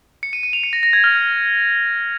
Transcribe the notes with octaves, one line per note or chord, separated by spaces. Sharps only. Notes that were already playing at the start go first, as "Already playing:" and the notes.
C#7
D#7
D#7
F7
C#7
A#6
A#6
G#6
F6